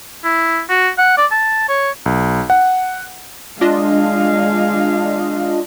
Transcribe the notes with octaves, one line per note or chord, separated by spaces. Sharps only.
E4
F#4
F#5
D5
A5
C#5
B1
F#5
G#3 D4 F4 D#5 F5